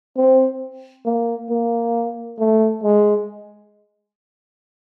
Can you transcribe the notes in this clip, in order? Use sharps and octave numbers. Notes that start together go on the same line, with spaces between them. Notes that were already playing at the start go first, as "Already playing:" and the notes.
C4
A#3
A#3
A3
G#3